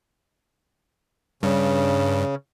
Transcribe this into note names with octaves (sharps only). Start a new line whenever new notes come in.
G2 C#3